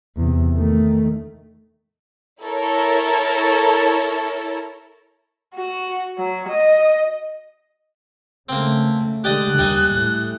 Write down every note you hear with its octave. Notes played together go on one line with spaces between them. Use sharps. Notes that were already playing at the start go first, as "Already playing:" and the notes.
E2 C3
D#3 A3
E4 A4 A#4 C#5
F#4
F#3
D#5
C#3 A3 A#3 C4
D3 G#3 G4 D5 D#5 F#6
D#2 G3 D#4 G#5
A2